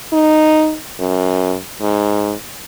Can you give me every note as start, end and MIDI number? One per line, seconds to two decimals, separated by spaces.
0.13 0.76 63
1.00 1.56 42
1.81 2.33 44